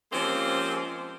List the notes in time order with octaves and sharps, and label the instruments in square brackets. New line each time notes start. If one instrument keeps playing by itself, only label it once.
[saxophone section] F3 G#3 A#3 C4 C#4 G4